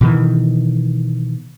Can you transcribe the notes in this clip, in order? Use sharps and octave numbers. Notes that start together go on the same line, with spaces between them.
B2 D#3 E3